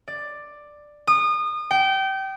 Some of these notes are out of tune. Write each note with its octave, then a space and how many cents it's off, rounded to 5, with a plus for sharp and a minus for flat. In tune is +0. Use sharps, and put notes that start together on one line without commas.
D5 +10
D#6 -30
G5 -25